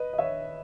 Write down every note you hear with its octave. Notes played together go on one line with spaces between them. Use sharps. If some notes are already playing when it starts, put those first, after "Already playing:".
Already playing: B4 D#5
D#5
C#5 E5